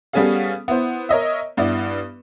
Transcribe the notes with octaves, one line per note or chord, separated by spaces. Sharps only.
G3 B3 C#4 G#4 A4 F5
B3 E4 C5
A#4 C#5 D#5 E5
G2 B3 E4 D5